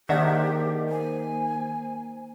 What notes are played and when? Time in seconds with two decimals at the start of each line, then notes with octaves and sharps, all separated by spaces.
0.09 D#3 A#3 D4 G4 G#4 C5 E5 F#5
0.89 A#3 C5 G#5